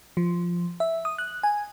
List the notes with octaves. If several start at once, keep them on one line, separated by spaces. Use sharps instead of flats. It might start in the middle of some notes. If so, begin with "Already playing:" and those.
F3
E5
D#6
F#6
G#5